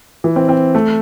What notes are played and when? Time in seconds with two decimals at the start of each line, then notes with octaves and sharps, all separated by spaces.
0.24 E3
0.36 C4
0.49 C4
0.75 A3